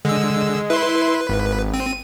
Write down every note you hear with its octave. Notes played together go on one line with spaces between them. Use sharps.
D3 G#3 E6
E4 B4 C6
G#1
C4 D#7